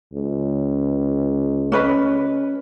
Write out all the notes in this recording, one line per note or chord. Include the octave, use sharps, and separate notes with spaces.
C#2
C#4 B4 D#5